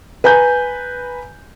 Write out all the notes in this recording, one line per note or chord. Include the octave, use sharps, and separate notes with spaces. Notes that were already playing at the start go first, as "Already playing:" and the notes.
B4 G#5 A#5 G6